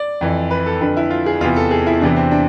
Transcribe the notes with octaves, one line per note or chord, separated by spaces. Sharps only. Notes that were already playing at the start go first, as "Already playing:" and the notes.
Already playing: D5
F2 E3
B4
A4
F2 D3 B4
E4
F4
G#4
E2 C3 E3 F4
A4
G#4
E4
E2 C3 E3 D4
C4
D4